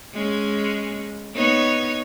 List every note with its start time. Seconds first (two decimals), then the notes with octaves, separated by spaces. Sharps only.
0.14 G#3 C#4
1.34 B3 D#4 C#5